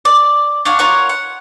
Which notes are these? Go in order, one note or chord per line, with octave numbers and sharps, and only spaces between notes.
D5
D4 C#5 F5 F#5
F4 A#4 C#5 F#5
F#5